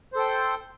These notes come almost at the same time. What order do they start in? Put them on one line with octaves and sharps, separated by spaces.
C5 A4 G5